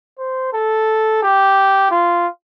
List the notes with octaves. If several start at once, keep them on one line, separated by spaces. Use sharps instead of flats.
C5
A4
G4
F4